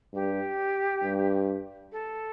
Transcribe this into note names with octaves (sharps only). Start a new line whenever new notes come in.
G2 G4
G2
A4